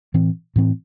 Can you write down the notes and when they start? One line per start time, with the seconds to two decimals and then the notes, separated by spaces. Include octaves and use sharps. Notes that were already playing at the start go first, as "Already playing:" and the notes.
0.14 A2 E3 C4
0.56 A2 E3 C4